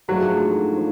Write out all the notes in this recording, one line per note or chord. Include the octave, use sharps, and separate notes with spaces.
G#2 F3 F#3 A3 D4
F3